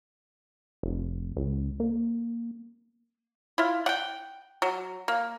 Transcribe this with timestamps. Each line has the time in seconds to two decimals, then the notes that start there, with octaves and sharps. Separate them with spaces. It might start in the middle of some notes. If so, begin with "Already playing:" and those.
0.83 F1
1.37 C#2
1.80 A#3
3.58 E4 F4
3.86 F#5 G5
4.62 F#3
5.08 A#3